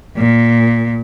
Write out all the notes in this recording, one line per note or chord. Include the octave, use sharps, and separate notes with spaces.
A#2